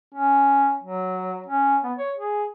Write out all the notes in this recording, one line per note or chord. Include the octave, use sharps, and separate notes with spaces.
C#4
F#3
C#4
B3
C#5
G#4